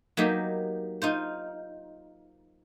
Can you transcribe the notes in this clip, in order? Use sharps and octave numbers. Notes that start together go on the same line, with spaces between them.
F#3 A#3 B3 D#4 G4
D#4 F4 C5